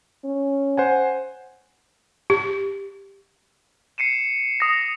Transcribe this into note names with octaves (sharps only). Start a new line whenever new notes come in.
C#4
C5 F#5 G#5
G4
C7 C#7 D#7 E7
D#6 A#6